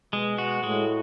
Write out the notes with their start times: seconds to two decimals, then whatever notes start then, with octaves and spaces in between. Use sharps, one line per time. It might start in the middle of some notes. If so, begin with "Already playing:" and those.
0.13 B2 G#3
0.38 F#4
0.63 A2 G#3